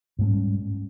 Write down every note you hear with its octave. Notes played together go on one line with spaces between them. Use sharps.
G#2 G3 A3 C#4